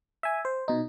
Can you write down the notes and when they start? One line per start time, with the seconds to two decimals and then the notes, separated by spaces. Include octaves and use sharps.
0.23 E5 G#5
0.45 C5
0.68 B2 D#4